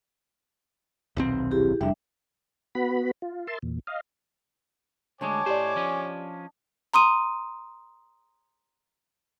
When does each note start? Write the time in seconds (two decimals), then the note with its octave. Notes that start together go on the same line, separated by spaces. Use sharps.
1.17 D#1 B1 C4
1.51 E4 G4 G#4
1.81 F1 G3 D4 E5
2.75 B3 F#4 B5
3.22 F4
3.47 A#4 E5 A5 C6
3.62 E2 A#2
3.87 D#5 F5
5.21 D2 G#3 D4 C#5 D#5 G#5 D6
5.46 A2 G4 C5 D5
5.76 F3 C#4
6.93 A#5 C6 D#6 D#7